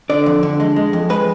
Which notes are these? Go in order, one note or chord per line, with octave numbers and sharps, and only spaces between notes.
D3 D5
F2
D3
G#3
G#3
F2
G#3 B4